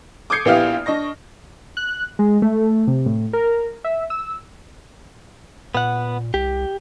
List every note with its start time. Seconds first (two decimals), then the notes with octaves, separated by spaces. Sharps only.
0.30 D6 D#6 G6 G#6 C7 C#7
0.45 A#1 B3 E4 G4 F5 F6
0.86 D4 D#5 C#6 A#6
1.77 F#6
2.19 G#3
2.42 A3
2.87 C3
3.06 A2
3.33 A#4
3.84 E5
4.10 E6
5.75 A#2 B3 F#5
6.34 C2 G4